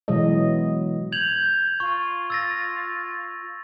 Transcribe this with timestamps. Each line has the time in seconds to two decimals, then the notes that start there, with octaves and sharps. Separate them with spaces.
0.08 B2 E3 F#3 G#3 D#5
1.12 G6 G#6 F7 F#7
1.80 F4 C#6
2.30 E6 A6 A#6